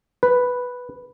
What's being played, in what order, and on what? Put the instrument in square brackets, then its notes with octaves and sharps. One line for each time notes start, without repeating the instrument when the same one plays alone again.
[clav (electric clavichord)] B4